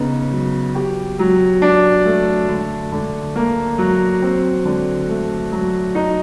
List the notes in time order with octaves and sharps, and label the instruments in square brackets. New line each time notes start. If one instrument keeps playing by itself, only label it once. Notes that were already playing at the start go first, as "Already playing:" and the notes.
Already playing: [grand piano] C#3 B3 D#4
F#3
G4
F#3
D4
A3
D3
D3
A#3
F#3
C4
D3
A3
F#3
D#4